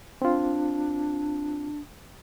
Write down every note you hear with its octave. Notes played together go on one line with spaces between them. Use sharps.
C4 D4 F4